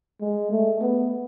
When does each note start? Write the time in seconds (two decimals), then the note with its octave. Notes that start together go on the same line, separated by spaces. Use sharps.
0.21 G#3
0.51 A3
0.81 B3